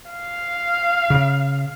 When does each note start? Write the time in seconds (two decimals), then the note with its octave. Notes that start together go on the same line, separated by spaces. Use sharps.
0.11 F5
1.10 C#3